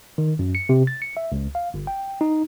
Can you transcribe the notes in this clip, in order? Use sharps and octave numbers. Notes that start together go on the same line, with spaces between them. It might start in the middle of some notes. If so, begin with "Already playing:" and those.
D#3
F#2
C#7
C3
A6
C#7
E5
C#2
F5
G1
G5
D#4